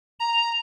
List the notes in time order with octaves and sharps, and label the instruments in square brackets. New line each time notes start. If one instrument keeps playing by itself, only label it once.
[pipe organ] A#5